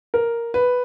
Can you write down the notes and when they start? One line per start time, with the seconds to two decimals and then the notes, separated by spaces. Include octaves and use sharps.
0.14 A#4
0.54 B4